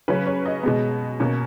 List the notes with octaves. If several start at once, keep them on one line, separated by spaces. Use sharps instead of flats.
C#3 F#3 C#4 B4
C#5
D#5
B2 G#3 B3
B2 A#3 C#4